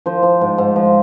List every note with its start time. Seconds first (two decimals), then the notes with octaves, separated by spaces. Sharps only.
0.06 F3 C5
0.23 F3
0.41 G#2
0.58 G#2
0.76 F3